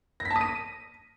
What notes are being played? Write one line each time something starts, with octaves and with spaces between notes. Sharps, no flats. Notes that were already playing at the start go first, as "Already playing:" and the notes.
A#6
B6
A5
D#6
D#7